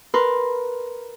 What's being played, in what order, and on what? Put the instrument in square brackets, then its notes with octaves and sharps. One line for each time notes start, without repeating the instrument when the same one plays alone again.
[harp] A#4 B4 C6